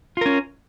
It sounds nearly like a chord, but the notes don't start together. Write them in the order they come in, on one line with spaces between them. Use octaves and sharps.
F4 A#4 C#4